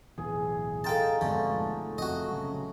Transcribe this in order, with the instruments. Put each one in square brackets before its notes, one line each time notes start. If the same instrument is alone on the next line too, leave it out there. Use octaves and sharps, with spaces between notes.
[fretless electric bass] D1 B1 E2 [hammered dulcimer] G#4
[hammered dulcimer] D#4 F4 A#4 [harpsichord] A4 G5 A5
[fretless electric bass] F2 G#2 B2 [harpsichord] D3 [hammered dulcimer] A3
[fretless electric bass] F1 F2 [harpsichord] F#4 D#5
[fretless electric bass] A#1 C#3 F#3